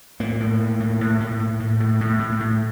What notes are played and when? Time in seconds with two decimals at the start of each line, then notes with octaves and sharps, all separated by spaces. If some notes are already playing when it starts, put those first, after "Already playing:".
0.20 A2 A#3
0.40 A2
0.60 A2
0.80 A2
1.01 A2
1.20 A2
1.39 A2
1.60 A2
1.80 A2
2.00 A2
2.19 A2
2.40 A2